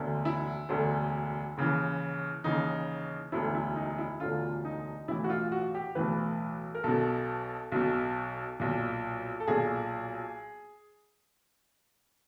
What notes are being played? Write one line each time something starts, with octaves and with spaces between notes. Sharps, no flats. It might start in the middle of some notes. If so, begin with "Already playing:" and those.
Already playing: E1 D2 D3
E4
E1 D2 D3
D#2 C#3 E3
D#2 C#3 E3 D#4
E1 D2 D3 E4
E4
D#4
E4
E1 D2 D3 F4
D#4
B1 A2 E3 E4
F#4
F4
F#4
G4
B1 A2 E3 B4
A#4
B1 B2 A4
B1 B2
B1 A#2
A4
B1 A#2 G#4